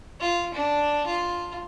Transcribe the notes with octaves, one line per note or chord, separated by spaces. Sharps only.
F4
D4
F4